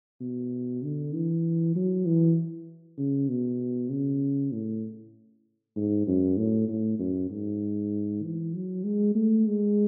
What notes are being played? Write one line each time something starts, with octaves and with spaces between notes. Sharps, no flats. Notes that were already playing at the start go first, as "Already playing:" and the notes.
B2
D3
E3
F#3
E3
C#3
B2
C#3
A2
G#2
F#2
A2
A2
F#2
G#2
E3
F#3
G#3
A3
G#3